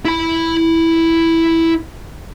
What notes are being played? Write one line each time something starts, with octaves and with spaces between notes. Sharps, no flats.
E4 B5